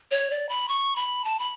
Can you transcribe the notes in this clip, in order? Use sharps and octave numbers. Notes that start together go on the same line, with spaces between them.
C#5
D5
B5
C#6
B5
A5
B5